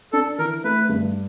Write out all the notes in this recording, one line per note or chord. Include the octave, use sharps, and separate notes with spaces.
D4 A4
E3 A#4
A3 B4
G2